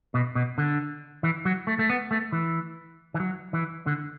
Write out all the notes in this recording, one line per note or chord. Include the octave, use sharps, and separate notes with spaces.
B2
B2
D3
E3
F#3
A3
A3
B3
A3
E3
E3
F#3
E3
D3